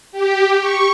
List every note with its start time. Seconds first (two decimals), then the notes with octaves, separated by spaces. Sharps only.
0.12 G4
0.60 C#6